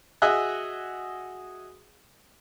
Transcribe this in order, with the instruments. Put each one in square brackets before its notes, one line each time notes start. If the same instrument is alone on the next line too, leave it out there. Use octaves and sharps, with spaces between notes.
[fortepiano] F#4 G#4 D#5 E5 G#5 F#6